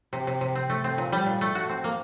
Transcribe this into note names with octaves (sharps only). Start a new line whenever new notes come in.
C3
C3
C3
C4
A3
C4
A#2
G3
A#2
A3
F#4
C4
A#3